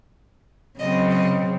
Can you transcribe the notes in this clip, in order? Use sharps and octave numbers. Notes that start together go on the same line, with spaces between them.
C#3 F#3 C4 D#5
D#5